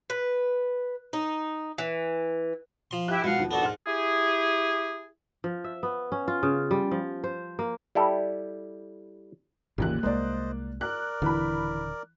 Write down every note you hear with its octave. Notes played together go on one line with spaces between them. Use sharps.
B4
D#4
E3
F3 C6
E4 G4 E5 F#6
B2 F3 G#3 F5 F#5
D#2 F3
B3 D4 F#4 A4
G#2 F#5 C6 F6
E4 G4 G#4
F3
E5
B3
C#4
F4
C#3
G3
F3
C5
A#3
G3 E4 G4 A4
G#1 D#2 A#2 C#3 E3 F#6
C2 G#3 A#3 C5 D5 D#5
A#4 D5 F#6
D#1 D3 E3 B5